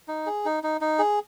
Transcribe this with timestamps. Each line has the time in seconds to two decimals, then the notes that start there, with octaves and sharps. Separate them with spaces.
0.08 D#4
0.26 G#4
0.45 D#4
0.63 D#4
0.81 D#4
0.99 G#4